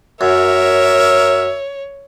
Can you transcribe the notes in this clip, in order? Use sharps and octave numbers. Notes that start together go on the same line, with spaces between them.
F#2 A#4 C#5 E5